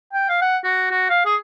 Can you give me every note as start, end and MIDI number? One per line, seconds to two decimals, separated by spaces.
0.13 0.26 79
0.29 0.39 77
0.41 0.57 78
0.64 0.89 66
0.91 1.09 66
1.10 1.25 77
1.26 1.36 68